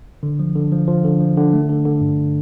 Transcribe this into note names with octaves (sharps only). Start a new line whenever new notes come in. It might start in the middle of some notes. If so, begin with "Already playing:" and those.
D3
F3
D3
F3
F3
D3
F3
D3
A3
D3
D3
G2